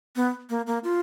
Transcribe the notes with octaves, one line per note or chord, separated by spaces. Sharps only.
B3
A#3
A#3
F4